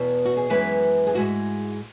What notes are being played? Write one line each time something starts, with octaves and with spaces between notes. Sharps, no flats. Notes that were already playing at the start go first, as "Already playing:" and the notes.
Already playing: E2 B2 B3 E4
F#4
G#4
F#2 E3 G#3 B3 B4
G#4
G#2 G#3 E4 F#4